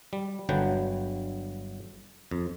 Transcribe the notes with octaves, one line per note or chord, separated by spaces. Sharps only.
G3
G1 D3 F#3 B4 G5
F2